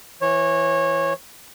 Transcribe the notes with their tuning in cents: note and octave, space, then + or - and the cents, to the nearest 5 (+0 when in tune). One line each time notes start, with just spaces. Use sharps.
E3 +10 C#5 -20